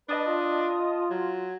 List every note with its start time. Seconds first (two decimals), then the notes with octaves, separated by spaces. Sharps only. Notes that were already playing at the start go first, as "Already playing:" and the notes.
0.09 D4 B4 D#5 A5 D#6
0.26 F4
1.10 F#3